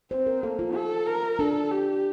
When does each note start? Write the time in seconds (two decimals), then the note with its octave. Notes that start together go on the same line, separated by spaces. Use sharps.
0.11 C4 C5
0.27 A#4
0.43 A#3 A4
0.59 F4
0.75 A4
1.07 A#4
1.39 D4 A4
1.71 G4